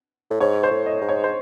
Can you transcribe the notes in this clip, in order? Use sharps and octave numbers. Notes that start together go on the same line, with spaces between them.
A2
G#2 C#5
C5
A2
D#5
G#2
C#5
C5